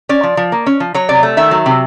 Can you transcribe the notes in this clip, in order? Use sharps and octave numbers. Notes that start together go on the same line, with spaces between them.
C#4 D5
F3
F3
A#3
C#4
F3
F#3 C#5
C3 D5
A3
D#3 E5
F#3
C3